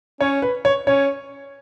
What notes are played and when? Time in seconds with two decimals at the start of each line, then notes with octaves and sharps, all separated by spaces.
0.21 C#4 C#5
0.42 B4
0.65 C#5
0.86 C#4 C#5